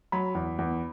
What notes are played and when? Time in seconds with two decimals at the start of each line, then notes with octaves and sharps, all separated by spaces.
0.12 F#3 B5
0.35 E2
0.58 E2